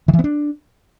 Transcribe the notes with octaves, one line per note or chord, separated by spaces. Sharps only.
D#3
E3
B3
D4